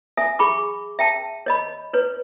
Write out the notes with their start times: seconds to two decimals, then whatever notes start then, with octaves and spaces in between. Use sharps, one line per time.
0.17 E5 G#5 D#6
0.39 G#4 B5 C#6 D6
0.99 E5 G5 A5
1.46 C#5 D#5 B5
1.93 B4 C#5